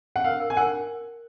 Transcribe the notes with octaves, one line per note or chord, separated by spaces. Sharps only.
F#5
A#4 F5
A#4
G#5
A#4 F#5